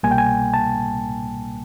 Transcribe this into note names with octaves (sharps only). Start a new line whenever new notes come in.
C2 B2 G3 A#3 G#5
G5
G#5
A5